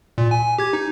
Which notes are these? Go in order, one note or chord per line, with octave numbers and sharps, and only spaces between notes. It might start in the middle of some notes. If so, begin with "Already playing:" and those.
A#2
G#5
G4 G#6
D#4